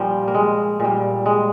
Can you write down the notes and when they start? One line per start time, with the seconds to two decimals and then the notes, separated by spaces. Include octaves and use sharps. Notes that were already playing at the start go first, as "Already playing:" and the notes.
Already playing: A#2 F3 G3
0.28 A#3
0.34 G#3
0.80 A#2 G3
1.26 G#3